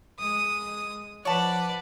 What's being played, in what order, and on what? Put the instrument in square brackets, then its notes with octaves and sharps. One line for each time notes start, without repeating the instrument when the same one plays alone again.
[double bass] G#3 [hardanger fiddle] D#6
[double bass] F3 [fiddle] B4 D5 [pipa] C#5 A5 [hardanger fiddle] F#5